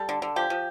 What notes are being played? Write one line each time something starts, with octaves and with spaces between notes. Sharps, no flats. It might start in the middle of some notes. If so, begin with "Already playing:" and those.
Already playing: G3 A4
D3
D3
F3 G4
F3